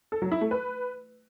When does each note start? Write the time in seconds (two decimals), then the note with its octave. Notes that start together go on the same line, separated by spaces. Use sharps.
0.12 A4
0.22 F#3
0.32 E4
0.41 A3
0.51 B4